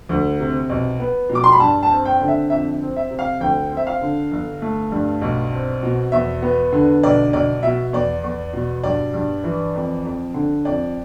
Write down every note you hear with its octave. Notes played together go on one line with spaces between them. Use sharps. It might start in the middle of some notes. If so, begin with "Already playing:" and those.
D2
C3
B1
B3
B2
D6
C6
B5
G2 A5
A5
C4
G5
D3
E5
F2 E5
C4
E5
C3
F5
D2 G5
C4
E5
F5
D3
G1
A3
G2
B1
C4
B2
E2 E5
B3
D3
B1 D5
B1 D5
B2 E5
E2 D5
E2
B2
G2 D5
G2
E3
F2
F2
D3
F2 D5